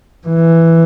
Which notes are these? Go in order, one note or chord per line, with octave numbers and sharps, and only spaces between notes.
E3